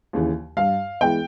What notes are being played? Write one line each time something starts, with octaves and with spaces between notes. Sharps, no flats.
D#2 C#3 E3
G2 F5
E3 G#3 B3 G5